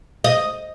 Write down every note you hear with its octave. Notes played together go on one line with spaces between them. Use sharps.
D#5